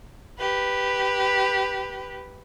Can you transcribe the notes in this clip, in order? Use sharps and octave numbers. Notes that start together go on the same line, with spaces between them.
G4 B4